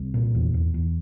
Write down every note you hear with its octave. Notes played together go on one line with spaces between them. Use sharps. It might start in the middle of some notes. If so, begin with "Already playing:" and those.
Already playing: C2
A#2
E2
E2
E2